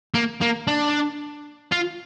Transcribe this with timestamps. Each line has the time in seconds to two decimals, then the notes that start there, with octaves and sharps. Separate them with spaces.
0.14 A#3
0.41 A#3
0.67 D4
1.72 F4